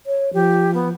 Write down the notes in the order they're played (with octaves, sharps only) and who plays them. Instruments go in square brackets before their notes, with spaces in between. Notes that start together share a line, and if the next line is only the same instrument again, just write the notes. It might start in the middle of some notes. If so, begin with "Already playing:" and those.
[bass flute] C#5
[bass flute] F3 [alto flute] G4
[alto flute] B3